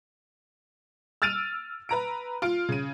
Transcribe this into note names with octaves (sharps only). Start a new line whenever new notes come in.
E6 F6 A6 D7 D#7 F7
B4 A#5 D7
F4 D7
C#3 D#7